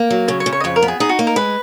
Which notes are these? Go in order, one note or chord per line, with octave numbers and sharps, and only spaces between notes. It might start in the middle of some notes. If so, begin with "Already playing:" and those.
Already playing: A#3
F#3
C#3 C#5
C#5
C#3
C#5
D#5
F2 C#5
A#4
B3
G#4
D#4 G#4
F#4
A#3
A#4
G#3 B4